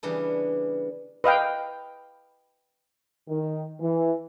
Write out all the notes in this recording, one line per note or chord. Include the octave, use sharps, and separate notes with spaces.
C#3 E3 G3 B3 D4
B4 D#5 F5 G5
D#3
E3